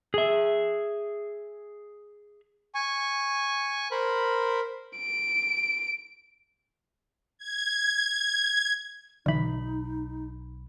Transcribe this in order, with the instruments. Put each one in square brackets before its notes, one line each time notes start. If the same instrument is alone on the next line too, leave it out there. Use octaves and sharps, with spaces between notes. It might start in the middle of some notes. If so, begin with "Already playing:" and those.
[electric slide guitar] G#4 E5
[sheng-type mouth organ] G#5 C#6
A#4 C5 B5
[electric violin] D7
[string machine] G#6
[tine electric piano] B1 B5 [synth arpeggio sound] D3 E3 [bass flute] D#4